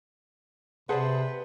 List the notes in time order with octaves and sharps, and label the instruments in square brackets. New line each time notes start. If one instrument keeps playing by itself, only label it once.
[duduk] C3 [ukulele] G#4 D5 [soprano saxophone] B4 [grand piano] C5 F#5 A5